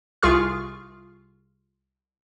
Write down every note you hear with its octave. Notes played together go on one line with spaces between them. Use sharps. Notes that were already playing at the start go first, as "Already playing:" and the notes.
C2 F4 G#4 C#6 F6